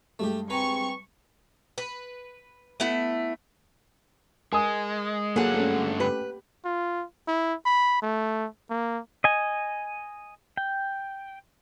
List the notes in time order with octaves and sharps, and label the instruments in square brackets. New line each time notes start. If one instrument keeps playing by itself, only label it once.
[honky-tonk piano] G2 G#3 [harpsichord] A3 G4
[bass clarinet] C4 [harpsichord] B4 G#5 A#5 [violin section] C#6
[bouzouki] B4
A3 B3 E4
[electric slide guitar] G#3 [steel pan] A#4 [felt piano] G#5 D#6
[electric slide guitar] G2 D3 F#5 [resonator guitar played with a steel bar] F#3 G#4 [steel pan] A#3 A4
[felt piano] A3 C#4
[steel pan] G4 [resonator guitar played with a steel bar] B4
[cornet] F4
E4
B5
A3
A#3
[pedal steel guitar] D#5 G#5
G5